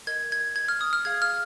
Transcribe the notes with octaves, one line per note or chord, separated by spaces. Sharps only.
A#4 D#5 G#6
G#6
G#6
F6
D#6
F6
G#4 F5 G#6
F6